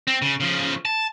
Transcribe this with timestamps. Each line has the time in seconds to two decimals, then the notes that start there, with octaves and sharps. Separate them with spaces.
0.07 C4
0.22 C#3
0.40 C#3 F3
0.85 A5